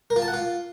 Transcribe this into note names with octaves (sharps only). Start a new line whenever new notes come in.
A#4
F4
A5
F#5
F4